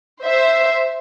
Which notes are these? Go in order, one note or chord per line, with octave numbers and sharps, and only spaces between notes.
C5 E5